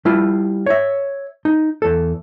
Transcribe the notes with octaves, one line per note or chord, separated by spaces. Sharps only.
G3 E4 F4
C#5 E5
D#4
E2 A4